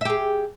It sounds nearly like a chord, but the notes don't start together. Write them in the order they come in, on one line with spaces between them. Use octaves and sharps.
E5 G4 G#4